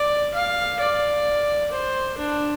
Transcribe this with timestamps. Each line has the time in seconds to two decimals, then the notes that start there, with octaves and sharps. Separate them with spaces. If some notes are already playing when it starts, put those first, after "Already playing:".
Already playing: D5
0.33 F5
0.80 D5
1.72 C5
2.18 D4